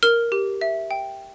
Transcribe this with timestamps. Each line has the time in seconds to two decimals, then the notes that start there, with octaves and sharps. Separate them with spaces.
0.03 A#4 F6
0.32 G4
0.61 E5
0.91 G5